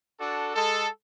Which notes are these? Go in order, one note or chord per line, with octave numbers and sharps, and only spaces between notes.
D4 F#4 A4
G#3 A4